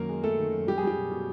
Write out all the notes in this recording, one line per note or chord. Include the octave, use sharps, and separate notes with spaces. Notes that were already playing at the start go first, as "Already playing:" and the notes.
Already playing: F#2 D#3 A#3 A#4
G#3
F#2 A3 A4
D#3
F#2
G3 G4
G#4
G3 G4
B2
B2